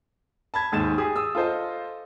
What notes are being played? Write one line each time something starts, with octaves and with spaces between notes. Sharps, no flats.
A5 B5 G#6
D#2 G#2 A6 E7
G4 G#4 D#6
D#6 E6
F4 A4 C5 D#5